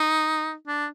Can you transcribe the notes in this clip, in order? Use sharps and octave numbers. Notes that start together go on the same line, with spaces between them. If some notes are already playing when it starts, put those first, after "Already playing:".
Already playing: D#4
D4